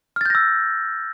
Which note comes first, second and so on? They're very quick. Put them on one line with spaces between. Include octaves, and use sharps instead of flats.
F6 A6 G6 A#6 E6